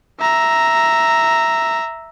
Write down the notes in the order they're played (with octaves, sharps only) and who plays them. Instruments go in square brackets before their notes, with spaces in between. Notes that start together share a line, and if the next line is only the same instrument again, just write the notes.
[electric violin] E5 A#5